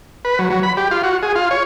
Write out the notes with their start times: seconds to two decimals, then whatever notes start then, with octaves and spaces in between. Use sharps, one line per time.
0.25 B4
0.39 F#3
0.50 F#3
0.63 B5
0.77 G4
0.91 F4
1.03 F#4
1.23 G#4
1.35 F4
1.51 C#5